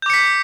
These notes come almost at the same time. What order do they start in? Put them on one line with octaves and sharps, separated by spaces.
G6 D6 C#7 B6